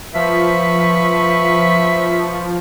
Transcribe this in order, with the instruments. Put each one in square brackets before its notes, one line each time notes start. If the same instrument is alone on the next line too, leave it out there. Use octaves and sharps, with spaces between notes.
[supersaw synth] F3 [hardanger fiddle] B4 C#6 [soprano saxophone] E5